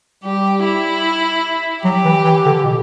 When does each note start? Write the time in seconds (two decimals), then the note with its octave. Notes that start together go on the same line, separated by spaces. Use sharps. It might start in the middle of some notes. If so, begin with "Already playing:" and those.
0.24 G3 G4
0.64 E4
1.84 F#3 G4
2.05 E3
2.24 E3
2.45 D3
2.64 B2